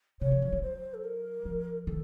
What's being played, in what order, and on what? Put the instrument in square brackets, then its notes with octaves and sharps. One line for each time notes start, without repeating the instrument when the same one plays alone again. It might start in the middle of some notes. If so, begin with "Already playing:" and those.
[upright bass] C3 [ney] C#5
[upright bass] F3
F3
F#3
[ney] C5
A4
A#4
[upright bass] F3
[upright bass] D#3 [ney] A4